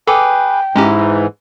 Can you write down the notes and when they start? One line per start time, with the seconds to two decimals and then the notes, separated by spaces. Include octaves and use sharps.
0.07 G#4 A4 B4 G5 D6
0.76 G#2 E3 G#3 C#4 G4 A#5